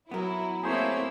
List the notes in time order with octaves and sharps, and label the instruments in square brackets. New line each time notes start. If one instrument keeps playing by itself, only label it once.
[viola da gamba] F#3 [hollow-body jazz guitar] B3 A#4 [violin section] E4
[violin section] A3 A#3 E6 [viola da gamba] C4 E4 [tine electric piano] G#4 C5 C#5